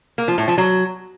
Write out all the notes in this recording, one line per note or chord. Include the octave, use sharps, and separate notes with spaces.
A#3
F3
A2
F3
F#3